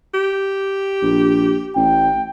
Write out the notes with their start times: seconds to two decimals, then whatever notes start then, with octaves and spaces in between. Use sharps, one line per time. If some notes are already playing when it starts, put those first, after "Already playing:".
0.14 G4
1.02 A#1
1.76 A1 G5